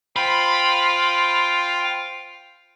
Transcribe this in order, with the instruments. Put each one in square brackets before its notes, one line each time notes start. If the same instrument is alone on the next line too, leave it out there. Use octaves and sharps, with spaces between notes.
[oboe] F4 [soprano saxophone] C5 [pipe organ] G5 [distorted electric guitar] B5